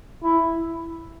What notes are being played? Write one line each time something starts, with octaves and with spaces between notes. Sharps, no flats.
E4